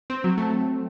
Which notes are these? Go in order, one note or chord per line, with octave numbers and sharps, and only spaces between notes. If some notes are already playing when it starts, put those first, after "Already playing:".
C4
F#3
A3